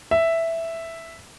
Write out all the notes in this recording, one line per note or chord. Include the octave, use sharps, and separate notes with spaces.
E5